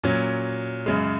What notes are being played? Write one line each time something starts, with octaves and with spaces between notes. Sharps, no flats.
A#2 F#3 C#4
F#2 C#3 G#3